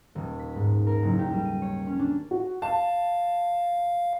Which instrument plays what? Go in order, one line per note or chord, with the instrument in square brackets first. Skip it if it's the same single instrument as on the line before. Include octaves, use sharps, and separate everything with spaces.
[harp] D#1
B6
G#2
A#4
F#1
G4
G3
D#7
C#5
C#4
D4
[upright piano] F#4
[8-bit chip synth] F5 [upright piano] A5